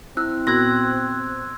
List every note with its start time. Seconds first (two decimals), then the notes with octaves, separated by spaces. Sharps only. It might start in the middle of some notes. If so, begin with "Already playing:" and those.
0.17 C4 E4 E6 F#6
0.47 A#2 B3 F#4 C6 E6 F#6 G#6 A#6